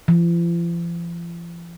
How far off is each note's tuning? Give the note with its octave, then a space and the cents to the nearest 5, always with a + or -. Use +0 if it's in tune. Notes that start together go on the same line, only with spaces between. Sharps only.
F3 -45